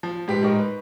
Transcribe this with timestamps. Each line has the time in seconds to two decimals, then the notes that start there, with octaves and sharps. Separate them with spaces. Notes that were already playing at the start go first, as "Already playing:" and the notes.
0.03 F3
0.28 G#2 G4 B4 B6
0.43 G#2 D#4 A#4 C#6
0.59 B4